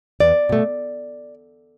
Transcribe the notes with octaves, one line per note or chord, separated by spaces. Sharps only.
E2 D5
B2 A3